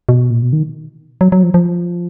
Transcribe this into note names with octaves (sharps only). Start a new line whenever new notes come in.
B2
A#2
B2
D#3
F#3
F#3
F3
F3